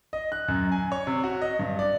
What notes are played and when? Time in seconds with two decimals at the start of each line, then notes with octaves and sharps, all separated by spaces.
0.13 D#5
0.32 F#6
0.48 F#2
0.72 G#5
0.92 C#5
1.07 C3
1.24 F#4
1.42 D#5
1.59 G2
1.79 D5